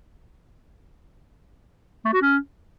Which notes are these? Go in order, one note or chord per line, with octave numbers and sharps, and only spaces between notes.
A3
F#4
C#4